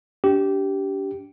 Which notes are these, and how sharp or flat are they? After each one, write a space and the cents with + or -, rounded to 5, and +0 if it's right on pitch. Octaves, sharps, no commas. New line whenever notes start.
D4 -35 G4 -15